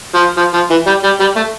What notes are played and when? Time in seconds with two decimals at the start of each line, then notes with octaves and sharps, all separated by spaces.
0.15 F3
0.37 F3
0.54 F3
0.70 E3
0.87 G3
1.04 G3
1.20 G3
1.36 A3